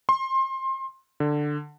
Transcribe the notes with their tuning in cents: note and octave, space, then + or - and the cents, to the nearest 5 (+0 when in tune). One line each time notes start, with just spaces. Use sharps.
C6 +25
D3 +10